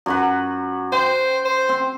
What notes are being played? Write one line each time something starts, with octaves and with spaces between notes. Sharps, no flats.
F#2 F#4 B4
C5 G5
C5
C4